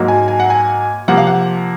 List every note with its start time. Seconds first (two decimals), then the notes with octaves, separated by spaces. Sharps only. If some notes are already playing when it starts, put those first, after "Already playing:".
Already playing: G#2 F#3 A#3
0.08 G#5
0.28 G#5
0.40 F#5
0.50 G#5
1.08 C3 F3 A#3 F#5
1.17 F5
1.27 F#5